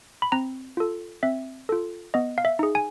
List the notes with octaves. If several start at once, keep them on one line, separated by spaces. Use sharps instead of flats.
B5
C4 A#5
F4 A4
C4 E5
F4 A4
B3 D#5
F5
E5
D#4 G#4
G#5